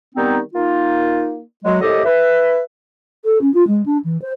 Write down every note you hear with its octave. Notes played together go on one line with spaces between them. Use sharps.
D#3 G3 B3 C4 D#4
A#3 D#4 F4
F#3 G#3
C2 A2 G4 A4 D#5
B4 E5
A4
C#4
F4
G#3
D4
E3
C5